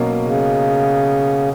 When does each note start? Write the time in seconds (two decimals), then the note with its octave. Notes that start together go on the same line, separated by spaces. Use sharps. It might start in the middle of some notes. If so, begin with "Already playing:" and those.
Already playing: B2 F#3 A#3 C#4
0.23 C#3